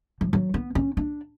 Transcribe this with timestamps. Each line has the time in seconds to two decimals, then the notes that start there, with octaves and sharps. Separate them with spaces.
0.21 F3
0.33 F#3
0.54 B3
0.75 C#4
0.97 D4